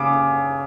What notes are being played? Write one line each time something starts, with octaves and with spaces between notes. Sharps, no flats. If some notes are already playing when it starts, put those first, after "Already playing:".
Already playing: C#3 D6